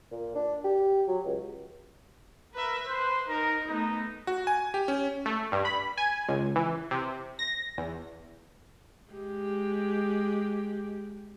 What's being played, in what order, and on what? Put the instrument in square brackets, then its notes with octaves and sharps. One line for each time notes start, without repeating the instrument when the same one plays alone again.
[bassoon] A#2
D4
G4
F#3
C#2
[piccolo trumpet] A#4 [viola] B4 E5
[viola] B4 [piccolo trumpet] C5
[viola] D#4 [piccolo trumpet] A#4
[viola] A3 B3 [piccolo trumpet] D#4
[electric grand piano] F#4
G#5
G4
C#4
[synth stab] A3
G2
B5
G#5
C#2
E3
C3
A#6
E2
[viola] G#3 G4